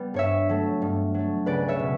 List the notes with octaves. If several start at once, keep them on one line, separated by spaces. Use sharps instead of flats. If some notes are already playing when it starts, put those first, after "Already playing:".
Already playing: G3 B3
G2 C#5 E5
F#3 A3
G2
F#3 A3
C#2 B4 D5
C#5 E5
B2